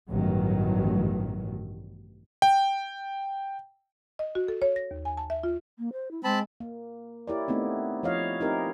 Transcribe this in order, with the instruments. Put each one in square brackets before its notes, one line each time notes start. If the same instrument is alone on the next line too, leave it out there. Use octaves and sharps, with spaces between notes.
[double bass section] A1 G2 B2 D#3 F#3
[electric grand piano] G5
[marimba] D#5
F#4
A4
C#5
A#6
D#2
G#5
A5
E5
F4
[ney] A#3
C5
E4
[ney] G#3 [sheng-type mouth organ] C4 A5 B5
[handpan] A#3
E4 G4 A#4 C#5 D5
A3 B3 C4 D#4
F3 E4 C#5 D#5 F5
C4 D#4 E4 G4 A#4